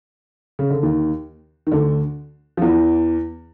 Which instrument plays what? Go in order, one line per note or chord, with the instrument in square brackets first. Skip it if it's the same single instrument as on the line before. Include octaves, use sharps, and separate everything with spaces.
[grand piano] C#3
D3
D#2 D#3
D#3
D2 D3
F3
E2 E3